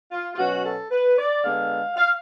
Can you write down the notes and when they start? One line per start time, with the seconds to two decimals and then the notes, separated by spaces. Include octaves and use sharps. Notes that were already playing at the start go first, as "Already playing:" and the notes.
0.12 F4
0.34 F4
0.38 B2 F#3 C#4 F#4
0.65 A4
0.91 B4
1.17 D5
1.44 D3 G#3 B3 F5
1.96 F5